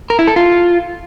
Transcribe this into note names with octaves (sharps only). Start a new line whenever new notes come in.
A#4
E4
A4
F4